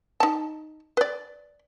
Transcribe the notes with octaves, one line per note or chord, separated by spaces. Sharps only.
D#4 A5
B4 D5